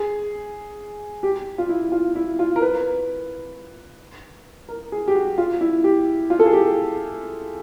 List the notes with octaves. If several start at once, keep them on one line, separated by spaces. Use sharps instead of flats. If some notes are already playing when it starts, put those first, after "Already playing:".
Already playing: G#4
G4
F4
E4
F4
E4
F4
A#4
B4
A#4
G#4
G4
F#4
F4
E4
G4
F4
A4
G#4
G4